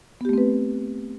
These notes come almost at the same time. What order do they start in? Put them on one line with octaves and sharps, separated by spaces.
B3 G4 A3 C4 B4